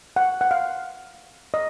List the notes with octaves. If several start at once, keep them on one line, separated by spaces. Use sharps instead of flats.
F#5
F#5
F5
D#5